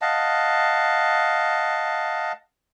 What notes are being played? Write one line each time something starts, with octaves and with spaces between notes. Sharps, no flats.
D#5 F5 F#5 A5